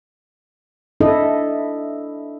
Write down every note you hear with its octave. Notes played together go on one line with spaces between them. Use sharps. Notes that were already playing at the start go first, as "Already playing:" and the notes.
D4 E4 A4 D#5